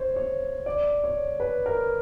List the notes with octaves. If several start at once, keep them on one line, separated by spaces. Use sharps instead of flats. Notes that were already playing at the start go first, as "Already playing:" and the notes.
Already playing: C5 C#5
C#5
D5
C#5
B4
A#4